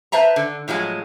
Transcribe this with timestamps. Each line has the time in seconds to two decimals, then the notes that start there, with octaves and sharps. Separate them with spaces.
0.12 B4 C5 E5 A5 A#5
0.36 D3
0.68 A2 F3 F#3 G#3